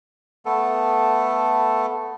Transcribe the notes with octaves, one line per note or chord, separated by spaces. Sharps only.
A3 B3 A4